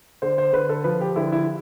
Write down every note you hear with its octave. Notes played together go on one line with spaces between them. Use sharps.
D3 C5
C5
D3 B4
A4
F3 B4
G4
D3 E4
E4